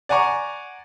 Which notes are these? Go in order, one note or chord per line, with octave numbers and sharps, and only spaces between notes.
D5 F#5 G#5 A#5 C#6